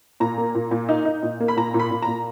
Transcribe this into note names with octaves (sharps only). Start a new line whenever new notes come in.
A#2 A#5
A#3
A#2
A#2
D#4
D#4
A#2
A#3
B5
A#2 A#5
A#2
B5
A#2
A#5
A#2